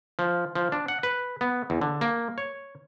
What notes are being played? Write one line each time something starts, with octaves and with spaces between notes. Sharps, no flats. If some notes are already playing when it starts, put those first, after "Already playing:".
F3
F3
D4
F#5
B4
B3
E2
D3
A#3
C#5